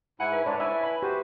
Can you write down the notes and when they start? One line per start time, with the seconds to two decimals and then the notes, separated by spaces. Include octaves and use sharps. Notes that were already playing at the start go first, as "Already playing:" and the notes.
0.20 G#2 E4 F#5 G#5
0.32 B4
0.46 G#2 G#3 D4 C#5 D5
0.60 E4 E5 G#5
0.83 B5
1.02 F#4 G4 C5